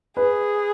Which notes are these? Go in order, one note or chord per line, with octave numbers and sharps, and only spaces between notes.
G#4 B4